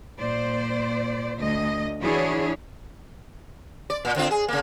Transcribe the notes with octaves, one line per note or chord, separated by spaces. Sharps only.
A#2 C5 D5
D2 D#5
E3 D4 E4 F#4 G#4 C#5
D5
A#2
D3 C4 F4
G#4
C#3 A#3